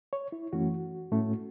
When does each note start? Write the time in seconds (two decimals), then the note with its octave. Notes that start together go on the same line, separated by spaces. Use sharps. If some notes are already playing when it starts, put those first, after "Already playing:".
0.13 C#5
0.32 E4
0.53 F#2 E3 A3 C#4 F#4
1.12 A2 A3 C#4